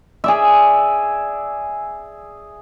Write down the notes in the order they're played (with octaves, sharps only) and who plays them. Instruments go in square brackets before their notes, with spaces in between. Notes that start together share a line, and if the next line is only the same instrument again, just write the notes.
[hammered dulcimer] G#4 D5 E5